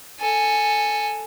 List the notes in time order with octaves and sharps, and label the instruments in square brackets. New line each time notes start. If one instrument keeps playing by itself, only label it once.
[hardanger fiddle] A4 G#5